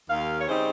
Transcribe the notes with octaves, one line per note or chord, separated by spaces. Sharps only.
D#2 F5
C#5
C#3 G3 C4 D#4 C5